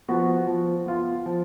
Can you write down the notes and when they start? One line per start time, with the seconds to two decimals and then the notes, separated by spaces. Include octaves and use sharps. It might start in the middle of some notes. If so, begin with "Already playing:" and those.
0.08 F3 B3 F#4
0.47 F3
0.86 B3 F4
1.26 F3